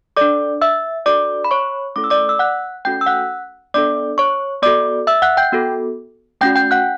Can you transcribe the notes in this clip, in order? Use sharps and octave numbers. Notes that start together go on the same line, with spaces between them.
D4 A4 D5 D6
E5 E6
D4 F#4 A4 D5 D6
B5
C#5 C#6
A3 C#4 E4 A4 D6
E6
D5 D6
E6
F#5 F#6
A3 C#4 F#4 A4 G5 G6
E6
F#5 F#6
B3 D4 A4 D5 D6
C#5 C#6
B3 F#4 A4 D5 D6
E5 E6
F#5 F#6
G5 G6
B3 F#4 A4
A3 C#4 F#4 G5 G6
G5 G6
F#5 F#6